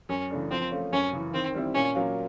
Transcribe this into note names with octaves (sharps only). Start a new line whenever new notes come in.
F#2 C#4
C#3 E3 A3 D4
F3 C4
A3 C#4 F4
F#2 C#4
C#3 E3
D#3 C4
G3 C4 E4
A#2 C#4
F#3 A#3 C#4 F4